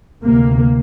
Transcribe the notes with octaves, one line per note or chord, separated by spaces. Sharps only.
D2 C3 A#3